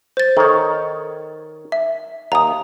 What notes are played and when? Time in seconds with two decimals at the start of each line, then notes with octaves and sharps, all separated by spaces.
0.17 C5 A6
0.37 D#3 A4 C#5
1.72 E5
2.32 D#2 A#5 D#6